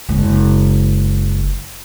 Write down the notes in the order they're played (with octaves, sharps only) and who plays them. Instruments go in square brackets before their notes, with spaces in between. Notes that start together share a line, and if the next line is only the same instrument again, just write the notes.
[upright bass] F#1 G#3